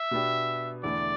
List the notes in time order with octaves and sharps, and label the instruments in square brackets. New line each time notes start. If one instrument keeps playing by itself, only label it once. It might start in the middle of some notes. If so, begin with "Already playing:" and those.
Already playing: [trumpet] E5
[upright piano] B2 B3 D4 G4
[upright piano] E2 D3 A3 E4 [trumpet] D5